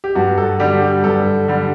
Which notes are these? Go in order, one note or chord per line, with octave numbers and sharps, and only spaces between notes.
G4
G2 F#4
A4
D3 G3 G4
G4
G2 A4
D3 G3